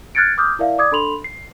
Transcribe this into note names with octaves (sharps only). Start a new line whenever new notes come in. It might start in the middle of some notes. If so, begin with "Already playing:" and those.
F6 F#6 G#6 A6 C#7 D7
D6 D#6 F6 G6
E4 A#4 D5 E5 F5
D5 D6 D#6 G#6
D4 A4 B5 C6 F7 F#7
C7